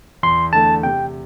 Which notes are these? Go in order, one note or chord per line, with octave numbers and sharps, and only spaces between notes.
E2 C6
D3 A3 A5
C3 G5